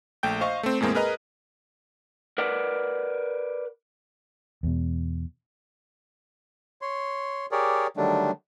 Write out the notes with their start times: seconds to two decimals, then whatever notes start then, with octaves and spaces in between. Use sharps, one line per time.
0.23 A#1 A3 G5 G6
0.41 C5 D#5 F5 C#6
0.63 A3 C4
0.81 E2 A2 G#3 A#3 C4
0.95 G#4 A#4 B4 D#5 A#5 F6
2.38 A#4 B4 D5 F#5
4.63 E2 B2
6.82 C#5 C6
7.52 G4 G#4 A#4 C#5 D5
7.97 D3 D#3 F#3 G3 A3 D4